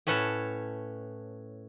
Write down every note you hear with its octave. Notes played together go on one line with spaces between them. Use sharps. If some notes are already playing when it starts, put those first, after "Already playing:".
A2 C#4 B4 F#5 A5